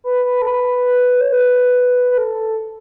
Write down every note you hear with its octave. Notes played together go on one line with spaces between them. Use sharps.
B4
B4
A4
B4
C#5
B4
B4
A4